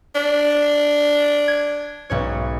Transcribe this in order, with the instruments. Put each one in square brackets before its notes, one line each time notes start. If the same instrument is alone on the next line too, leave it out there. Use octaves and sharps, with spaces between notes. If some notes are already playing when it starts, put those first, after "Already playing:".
[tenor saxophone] D4
[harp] G#6
B1 G#2 C#5